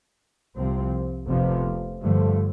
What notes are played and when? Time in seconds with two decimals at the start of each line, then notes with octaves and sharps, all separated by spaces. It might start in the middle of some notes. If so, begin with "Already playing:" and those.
0.55 C2 C3 F3 C4
1.27 F1 F2 C3 F3 B3
2.01 G2 D3 F3 A3